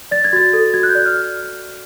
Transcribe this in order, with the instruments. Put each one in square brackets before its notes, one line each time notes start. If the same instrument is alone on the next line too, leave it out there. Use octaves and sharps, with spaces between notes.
[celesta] D5 A6
G#6
F#4 A6
A4
F#4 G#6
F#6
G6
D5
F6